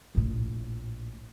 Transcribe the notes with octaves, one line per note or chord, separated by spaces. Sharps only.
A#1 A2